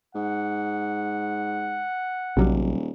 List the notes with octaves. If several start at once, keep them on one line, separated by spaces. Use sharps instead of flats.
G#2 F#5
D#1 A#1 C3 F#3 G3